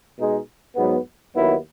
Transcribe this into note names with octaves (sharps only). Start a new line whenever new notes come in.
B2 G#3 D#4
G#2 F#3 B3
D#2 D#3 F#3 B3 E4